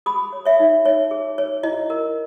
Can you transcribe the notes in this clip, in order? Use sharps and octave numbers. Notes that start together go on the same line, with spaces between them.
G#4 B5 D#6
C#5
C#5 E5
D#4
D#4 C#5
G#4
C#5
E4 D#5
A#4